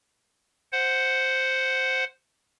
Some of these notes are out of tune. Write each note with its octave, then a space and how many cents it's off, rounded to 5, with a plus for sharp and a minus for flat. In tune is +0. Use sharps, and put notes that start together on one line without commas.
C5 +0 F#5 +0